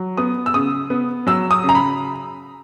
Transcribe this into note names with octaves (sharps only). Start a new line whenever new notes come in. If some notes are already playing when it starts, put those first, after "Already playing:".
Already playing: F#3
B3 D#6
E6
C#3 D#6
B3
F#3 E6
D#6
C#3
A#5
B5